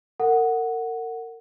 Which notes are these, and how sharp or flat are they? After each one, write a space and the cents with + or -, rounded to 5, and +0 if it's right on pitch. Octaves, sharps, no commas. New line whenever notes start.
A#4 -35 F#5 +0